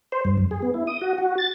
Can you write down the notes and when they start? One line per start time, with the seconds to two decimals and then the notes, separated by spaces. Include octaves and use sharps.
0.12 C5
0.25 G2
0.38 F#2
0.51 G#4
0.62 B3
0.74 E4
0.87 D#6
1.01 F#4
1.18 F#4
1.38 A6